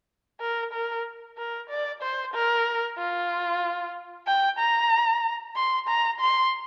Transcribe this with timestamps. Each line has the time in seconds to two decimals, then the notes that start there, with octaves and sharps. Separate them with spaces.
0.41 A#4
0.73 A#4
1.38 A#4
1.69 D5
2.02 C5
2.34 A#4
2.98 F4
4.27 G5
4.59 A#5
5.56 C6
5.88 A#5
6.20 C6